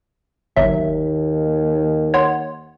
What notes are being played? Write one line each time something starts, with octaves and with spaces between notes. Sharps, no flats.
G1 D#2 F#3 E5
C#5 F#5 C6